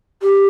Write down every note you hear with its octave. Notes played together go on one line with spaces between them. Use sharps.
G4